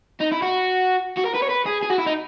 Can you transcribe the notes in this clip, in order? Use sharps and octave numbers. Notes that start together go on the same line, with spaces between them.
D#4
E4
F#4
F#4
A#4
B4
C#5
B4
G#4
G#4
F#4
E4
D#4